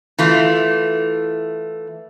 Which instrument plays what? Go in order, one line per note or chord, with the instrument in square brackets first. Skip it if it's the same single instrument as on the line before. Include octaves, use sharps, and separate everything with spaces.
[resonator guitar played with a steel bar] E3 A3 F4